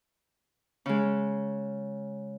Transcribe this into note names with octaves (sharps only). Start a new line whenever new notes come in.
C#3 G#3